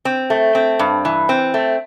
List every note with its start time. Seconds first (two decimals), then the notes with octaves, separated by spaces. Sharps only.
0.05 C4
0.30 A3
0.55 C4
0.79 G2
1.05 E3
1.29 C4
1.54 A3